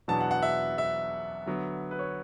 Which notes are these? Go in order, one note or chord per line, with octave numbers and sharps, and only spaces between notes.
E2 B2 F#3 B3 D4 A5
F#5
F#5
E5
E5
D3 F#3 B3
B4
C#5